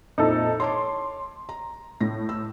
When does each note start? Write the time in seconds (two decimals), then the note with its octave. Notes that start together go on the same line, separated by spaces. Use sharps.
0.18 F2 A#2 D#4 E4 A4
0.60 C#5 A5 C6 D6
1.49 A#5
2.01 A2 A#6
2.29 E6